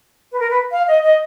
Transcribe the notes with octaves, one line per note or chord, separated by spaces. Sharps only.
B4
A#4
B4
F5
D#5
D#5